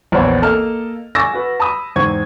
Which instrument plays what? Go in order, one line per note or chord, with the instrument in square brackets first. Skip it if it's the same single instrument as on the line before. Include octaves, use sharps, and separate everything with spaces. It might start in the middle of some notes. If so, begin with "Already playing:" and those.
[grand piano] A#1 E2 B3 C4 C#5
A#3 A4 D#5 A5 F6
G#5 C#6 D6 E6 A6 A#6
F#4 B4
A5 B5 D#6
E2 G#2 C4 C#6 G#6